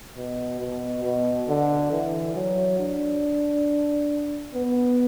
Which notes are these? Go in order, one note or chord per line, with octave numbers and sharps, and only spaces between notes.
B2
B2
B2
D3
E3
F#3
D4
B3